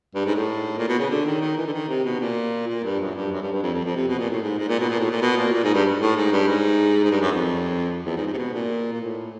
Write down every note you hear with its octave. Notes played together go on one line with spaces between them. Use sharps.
G2
G#2
A2
A#2
B2
C#3
D3
D#3
D#3
E3
D3
D#3
C3
B2
A#2
A#2
G2
F#2
G2
F#2
G2
G2
F2
F2
F2
C3
B2
A#2
A2
G#2
G#2
A#2
B2
A#2
A2
A#2
B2
A#2
A#2
G#2
G2
A2
G#2
G2
G#2
G#2
G2
F#2
F2
E2
G#2
G#2
C3
B2
A#2
A#2
A2